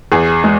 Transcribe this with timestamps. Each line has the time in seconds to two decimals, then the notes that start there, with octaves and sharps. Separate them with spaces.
0.12 E2 G#4
0.44 G#3